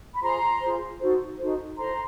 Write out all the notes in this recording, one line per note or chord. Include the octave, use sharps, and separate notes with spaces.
B5
F4 G#4 C5 A#5 C6
F4 G#4 C5
D#4 F#4 A4 C5
D#4 F#4 A4 C5
E4 A4 C5 A#5 C6